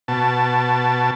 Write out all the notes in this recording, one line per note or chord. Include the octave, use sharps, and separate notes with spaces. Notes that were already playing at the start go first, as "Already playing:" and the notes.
B2 A5